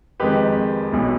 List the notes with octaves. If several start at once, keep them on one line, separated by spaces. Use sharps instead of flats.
F2 D#3 G#3 G4 B4
B1 B2 G3